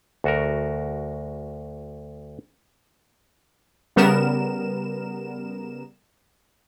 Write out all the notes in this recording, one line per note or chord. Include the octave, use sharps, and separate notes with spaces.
D2 F#4 A#4
C#3 G3 B3 A#4 E7